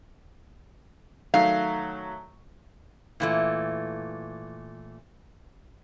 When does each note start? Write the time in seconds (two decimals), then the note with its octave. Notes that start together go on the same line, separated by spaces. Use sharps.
1.34 D#3 F#3 A3 F5
3.20 A#2 E3 A3